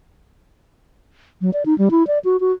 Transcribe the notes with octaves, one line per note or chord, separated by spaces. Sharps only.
F#3
D5
D#4
G3
E4
D5
F#4
F#4